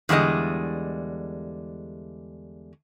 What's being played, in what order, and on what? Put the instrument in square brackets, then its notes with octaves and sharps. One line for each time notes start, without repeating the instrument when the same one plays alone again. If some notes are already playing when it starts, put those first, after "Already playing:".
[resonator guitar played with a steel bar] E2 D3 G3 G#3 D#5